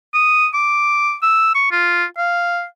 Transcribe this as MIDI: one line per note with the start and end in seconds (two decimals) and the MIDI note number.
0.14 0.47 87
0.54 1.15 86
1.23 1.51 88
1.55 1.67 85
1.72 2.05 65
2.17 2.65 77